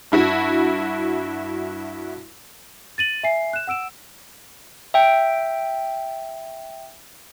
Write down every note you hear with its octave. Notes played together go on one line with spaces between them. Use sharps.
G2 E4 F#4
A6 D#7 F#7
E5 G#5 C7
F#6 E7
F#5 E6 D7 E7
E5 G5